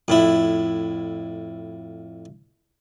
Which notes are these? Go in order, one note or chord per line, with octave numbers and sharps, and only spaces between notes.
F2 A2 E4